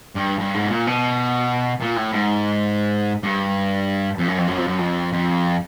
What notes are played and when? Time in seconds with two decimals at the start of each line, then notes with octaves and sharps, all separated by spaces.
0.15 G2
0.39 G2
0.54 G#2
0.65 A2
0.70 A#2
0.87 B2
1.81 A#2
1.97 A2
2.13 G#2
3.23 G2
4.18 F2
4.28 F#2
4.38 F2
4.47 F#2
4.58 F2
4.67 F#2
4.78 F2
5.13 F2